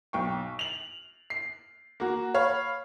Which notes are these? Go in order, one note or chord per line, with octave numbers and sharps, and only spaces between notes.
B1 G5 C#6
F7 F#7
C7
A#3 F#4
C#5 F5 B5